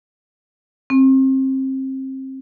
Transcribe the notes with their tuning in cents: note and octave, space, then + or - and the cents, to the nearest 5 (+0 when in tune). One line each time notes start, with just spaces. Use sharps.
C4 +25